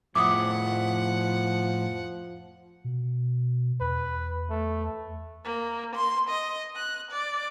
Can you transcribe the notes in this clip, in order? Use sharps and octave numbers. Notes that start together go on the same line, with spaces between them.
F2 A2 F3 E4 F#5 D6 D#6
B2
E2 B4
A3
A#3
C6
D#5
F#6
D5